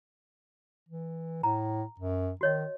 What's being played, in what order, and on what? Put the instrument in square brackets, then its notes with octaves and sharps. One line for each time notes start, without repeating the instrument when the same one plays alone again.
[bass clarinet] E3
[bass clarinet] A2 [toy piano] A#5
[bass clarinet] F#2
[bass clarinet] D#3 [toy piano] F#4 C#5 D#5